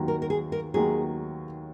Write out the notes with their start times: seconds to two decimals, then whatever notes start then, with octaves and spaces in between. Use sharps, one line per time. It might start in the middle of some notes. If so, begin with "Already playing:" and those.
Already playing: D#2 D#3 F#3
0.08 A#4
0.22 A#4
0.30 G#4
0.52 A#4
0.74 D#2 D#3 F#3 G#4